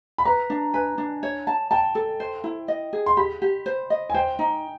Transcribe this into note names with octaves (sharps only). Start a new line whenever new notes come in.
B5
B4 A#5
D4
B4 G#5
D4
C#5
A5
G5 A5
A4
C5
E4
D#5
G#4
C6
G4 B5
G4
C5
D#5
G#5
C5 G5
D#4